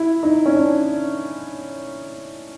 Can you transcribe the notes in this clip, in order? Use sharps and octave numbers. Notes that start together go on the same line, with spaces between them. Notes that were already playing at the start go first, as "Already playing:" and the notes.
Already playing: E4
D#4
C#4
D4